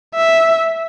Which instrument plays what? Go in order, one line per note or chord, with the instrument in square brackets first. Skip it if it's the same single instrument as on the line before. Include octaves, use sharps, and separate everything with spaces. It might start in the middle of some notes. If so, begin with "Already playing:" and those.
[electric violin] E5